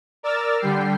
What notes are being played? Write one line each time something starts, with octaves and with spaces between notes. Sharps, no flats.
A#4 D5 E6 F6 A6
D3 G3 G5 C7